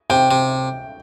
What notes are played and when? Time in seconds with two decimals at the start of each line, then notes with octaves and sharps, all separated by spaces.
0.10 C3 G5
0.31 C3